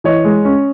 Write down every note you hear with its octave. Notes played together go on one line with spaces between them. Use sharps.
E3 C#5 D#5
G#3
C#4